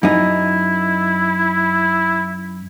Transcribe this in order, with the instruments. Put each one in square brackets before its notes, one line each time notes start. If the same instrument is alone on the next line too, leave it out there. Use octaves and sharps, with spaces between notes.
[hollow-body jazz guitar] F#2 D#4 [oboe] E4